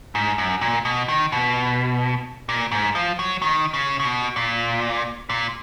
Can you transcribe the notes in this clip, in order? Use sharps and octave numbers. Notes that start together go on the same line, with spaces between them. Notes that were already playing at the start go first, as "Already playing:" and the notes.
G#2
F#2
A#2
B2
D#3
B2
A#2
G#2
F3
F#3
D#3
C#3
C#3
B2
A#2
A#2